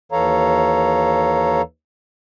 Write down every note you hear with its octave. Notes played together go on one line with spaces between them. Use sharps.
D#2 E3 A4 C#5 F5 A#5